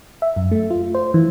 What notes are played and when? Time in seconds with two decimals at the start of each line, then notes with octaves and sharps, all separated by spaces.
0.22 E5
0.36 F#2
0.51 A3
0.70 F4
0.95 C5
1.14 E3